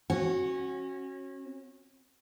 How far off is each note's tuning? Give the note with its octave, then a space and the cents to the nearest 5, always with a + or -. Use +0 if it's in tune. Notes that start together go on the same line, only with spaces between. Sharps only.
C#4 -30 F#4 +0